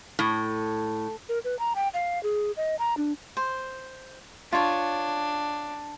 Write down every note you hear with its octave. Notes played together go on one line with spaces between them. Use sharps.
A2
A#4
B4
A#5
G5
F5
G#4
D#5
A#5
D4
C5
D4 F4 C#5